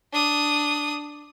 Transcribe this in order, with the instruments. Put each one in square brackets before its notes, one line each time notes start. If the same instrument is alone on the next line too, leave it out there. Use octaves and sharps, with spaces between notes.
[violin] D4 D#6